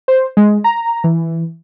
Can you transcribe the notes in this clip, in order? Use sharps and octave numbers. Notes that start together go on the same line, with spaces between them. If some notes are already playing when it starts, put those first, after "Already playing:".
C5
G#3
A#5
E3